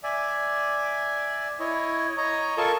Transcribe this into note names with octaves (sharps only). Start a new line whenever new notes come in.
D5 E5 G#5
E4 C#5 D#5
C#5 D#5 A#5
F4 A4 A#4 D#5 A5 C#6